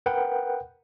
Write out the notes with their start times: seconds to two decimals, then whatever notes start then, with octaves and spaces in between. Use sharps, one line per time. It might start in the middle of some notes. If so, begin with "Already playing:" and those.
0.06 A#4 B4 F#5 G5